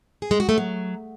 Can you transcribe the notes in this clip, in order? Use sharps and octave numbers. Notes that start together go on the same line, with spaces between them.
G#4
G#3
F#4
A3
F#3